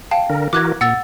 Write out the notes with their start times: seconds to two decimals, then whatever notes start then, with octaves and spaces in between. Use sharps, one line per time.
0.11 F5 G5 A5
0.30 D3 A#4
0.53 E3 F#4 A#4 D6 F#6 G#6
0.81 A#2 F#5 E6 A6